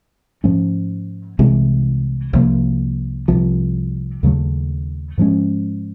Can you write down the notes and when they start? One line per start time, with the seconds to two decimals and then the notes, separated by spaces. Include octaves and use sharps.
0.44 G#2 F3 A3 C#4
1.39 C2 C3 E3 G#3
2.33 C2 C3 F3 A#3
3.28 C2 C3 F3
4.23 D#2 C#3 F#3 A3
5.18 G#2 F3 G#3 C#4